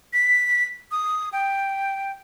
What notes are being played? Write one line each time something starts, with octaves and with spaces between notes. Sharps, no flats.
B6
D#6
G5